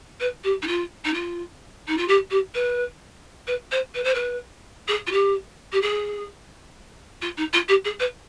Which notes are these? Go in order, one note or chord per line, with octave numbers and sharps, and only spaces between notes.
B4
G4
D#4
F4
D#4
F4
D#4
F4
G4
G4
B4
B4
C5
B4
C5
B4
G#4
F4
G4
G4
G#4
F4
D#4
F4
G4
G#4
B4